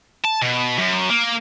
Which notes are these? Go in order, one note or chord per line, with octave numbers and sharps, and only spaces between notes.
A5
B2
F#2
A#3